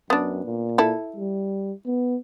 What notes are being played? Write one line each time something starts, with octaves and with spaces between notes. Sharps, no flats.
F#2 B3 D4
A#2
E4 A4
G3
B3